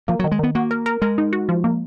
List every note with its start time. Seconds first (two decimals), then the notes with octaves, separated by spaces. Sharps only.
0.08 F3 A#3
0.19 D#3 F#3
0.32 G#3
0.39 D#3 B3
0.55 A#3 F#4
0.71 A#4
0.86 A#4
1.02 G#3 A#4
1.18 D#4
1.33 F#4
1.49 F3
1.64 A#3